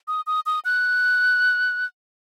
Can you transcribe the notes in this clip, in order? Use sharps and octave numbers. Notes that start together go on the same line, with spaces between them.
D#6
D#6
D#6
F#6